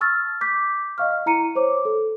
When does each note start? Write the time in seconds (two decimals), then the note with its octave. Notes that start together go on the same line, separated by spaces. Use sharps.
0.01 A5 C#6 E6 F6 A6
0.41 D6 G6 B6
0.98 D#5 F5 C#6 F6
1.26 E4 A#5 C#7 D#7
1.55 C5 C#5 D6
1.85 A4